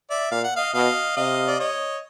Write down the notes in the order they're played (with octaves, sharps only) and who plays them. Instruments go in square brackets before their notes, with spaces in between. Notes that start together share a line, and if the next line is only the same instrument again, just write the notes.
[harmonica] D5 E5
[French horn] A#2 [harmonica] F5
[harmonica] F#5
D#5 F5
[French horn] B2 [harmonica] D#5 F5
[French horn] C3 [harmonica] D#5 F5
[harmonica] D5
C#5 D#5